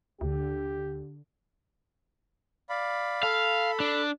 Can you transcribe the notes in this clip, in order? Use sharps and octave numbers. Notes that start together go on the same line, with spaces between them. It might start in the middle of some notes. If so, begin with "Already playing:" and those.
D2 D3 G4
D5 F5 B5
A4 F5 B5
D4